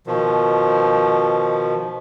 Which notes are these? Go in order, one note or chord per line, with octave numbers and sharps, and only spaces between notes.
B2 D#3 F3